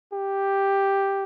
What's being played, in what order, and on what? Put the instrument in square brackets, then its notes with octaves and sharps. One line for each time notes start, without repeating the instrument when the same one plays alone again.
[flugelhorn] G4